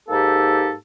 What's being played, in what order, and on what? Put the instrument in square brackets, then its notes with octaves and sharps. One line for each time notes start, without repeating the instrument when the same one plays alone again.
[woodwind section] G#2 A#3 D#4 G4 A4